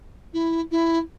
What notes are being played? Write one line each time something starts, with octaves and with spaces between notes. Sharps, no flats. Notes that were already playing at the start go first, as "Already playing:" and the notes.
E4
E4